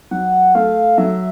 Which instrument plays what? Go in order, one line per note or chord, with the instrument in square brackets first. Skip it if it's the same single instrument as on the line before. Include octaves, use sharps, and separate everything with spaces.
[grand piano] F#3 [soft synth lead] F#5
[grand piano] A3 [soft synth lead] F5
[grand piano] F#3 [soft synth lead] E5